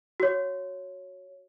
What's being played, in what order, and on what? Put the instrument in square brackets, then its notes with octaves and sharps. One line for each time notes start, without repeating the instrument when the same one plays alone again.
[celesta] F#4 C#5